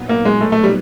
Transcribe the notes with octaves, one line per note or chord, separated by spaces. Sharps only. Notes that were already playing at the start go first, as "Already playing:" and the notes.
Already playing: A#2 F#3 B3 D#4
A#3
G#3
A3
A3
G3